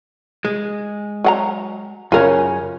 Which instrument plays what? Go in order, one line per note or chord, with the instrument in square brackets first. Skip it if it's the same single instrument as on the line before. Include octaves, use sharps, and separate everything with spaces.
[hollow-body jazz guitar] G#3
[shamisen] F#3 F#5 A#5
[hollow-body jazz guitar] F#2 C#3 C#4 [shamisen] F4 A#4